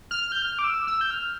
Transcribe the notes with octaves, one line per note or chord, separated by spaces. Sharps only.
F6
G6
F6
D6
E6
E6
G6
F6